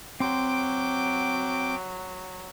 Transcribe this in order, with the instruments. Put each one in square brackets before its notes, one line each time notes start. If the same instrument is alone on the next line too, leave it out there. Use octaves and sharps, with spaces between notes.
[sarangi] F#3 [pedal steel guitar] C4 C6 [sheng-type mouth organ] G5 D6